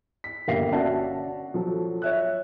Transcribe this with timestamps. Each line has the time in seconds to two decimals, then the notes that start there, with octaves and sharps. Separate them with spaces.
0.24 B6
0.48 G1 A#3 G4 F5 A#6 C7
0.72 C#4 F#4 D5 E5 F#5 A5
1.54 F3 F#3 A4
2.02 C#5 E5 F#6